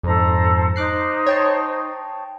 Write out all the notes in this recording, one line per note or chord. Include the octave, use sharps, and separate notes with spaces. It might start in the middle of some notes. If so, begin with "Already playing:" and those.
F2 G#2 A4 C5 A#5
D#4 C5 D6 F#6 C7
C#5 G5 A5